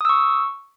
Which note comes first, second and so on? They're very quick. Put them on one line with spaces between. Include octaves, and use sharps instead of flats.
D#6 E6 C#6